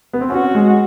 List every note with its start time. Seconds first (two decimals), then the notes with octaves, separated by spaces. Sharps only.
0.13 B3
0.21 C4
0.30 C#4 F#4
0.55 G#3